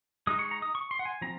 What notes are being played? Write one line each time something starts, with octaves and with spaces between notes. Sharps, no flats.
G#3 D#4 D#6
C#6
A#5
D#6
C#6
C6
F#5
G#5
F3 C4 A#5